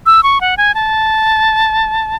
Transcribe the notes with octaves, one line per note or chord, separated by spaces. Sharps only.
E6
C#6
F#5
G#5
A5